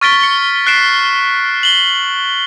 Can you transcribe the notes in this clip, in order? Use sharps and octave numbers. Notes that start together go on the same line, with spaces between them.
C#6 F6 A6 B6 D7 G7
C#7
F#6 B6 C7 D7 E7
F#7 G7